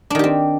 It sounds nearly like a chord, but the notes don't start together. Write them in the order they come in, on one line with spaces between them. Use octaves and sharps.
D4 D#3 G4 C4